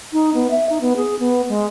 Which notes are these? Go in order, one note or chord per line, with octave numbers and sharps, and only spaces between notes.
D#4
B3
E5
D#4
B3
G#4
B3
G#3